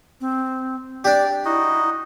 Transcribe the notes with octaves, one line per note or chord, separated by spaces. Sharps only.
C4
D4 G4 D5
D#4 E4 F#4 D#5